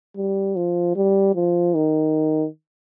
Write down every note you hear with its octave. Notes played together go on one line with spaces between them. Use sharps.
G3
F3
G3
F3
D#3